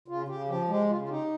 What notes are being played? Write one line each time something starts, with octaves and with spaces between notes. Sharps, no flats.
C#3 F4
C#3 G4
F3 G4
G#3 G4
C#3 F4
F4
D#4 G4